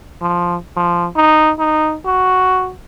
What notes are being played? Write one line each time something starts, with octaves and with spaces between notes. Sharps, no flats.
F3
F3
D#4
D#4
F#4